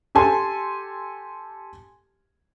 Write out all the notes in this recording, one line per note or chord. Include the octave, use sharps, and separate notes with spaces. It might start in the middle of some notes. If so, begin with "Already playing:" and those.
G4 A4 G#5 A5 C6